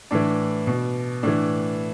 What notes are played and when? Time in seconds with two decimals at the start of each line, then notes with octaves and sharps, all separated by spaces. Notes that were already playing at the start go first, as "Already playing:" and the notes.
0.11 A2 E3 D4
0.67 B2
1.23 A2 E3 D4